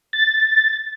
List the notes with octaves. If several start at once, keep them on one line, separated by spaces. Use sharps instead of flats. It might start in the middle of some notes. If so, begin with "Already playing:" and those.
A6